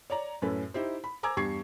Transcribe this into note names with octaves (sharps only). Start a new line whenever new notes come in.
C#5 D5 A#5
F#2 A2 C#4 A4 B4
D#4 E4 G4 C5
B5
C5 G#5 A#5 D6 E6 G#6
E2 G2 G4 C#6 G#6 C7